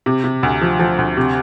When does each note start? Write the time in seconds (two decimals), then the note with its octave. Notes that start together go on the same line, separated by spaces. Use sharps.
0.06 C3
0.24 C3
0.43 D2
0.61 F3
0.79 F3
0.98 D2
1.17 C3